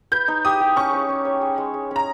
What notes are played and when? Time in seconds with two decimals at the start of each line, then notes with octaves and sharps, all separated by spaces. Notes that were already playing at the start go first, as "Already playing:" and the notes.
0.12 B4 G6
0.28 D#4
0.45 G4 D#6
0.60 G4
0.76 C#4 C#6
0.93 C#4
1.09 C#4
1.25 C#5
1.41 G#4
1.58 G#3
1.74 G#3
1.91 C#4 A#5